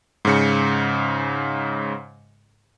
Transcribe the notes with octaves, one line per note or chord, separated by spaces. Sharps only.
G#2 C#3 C#7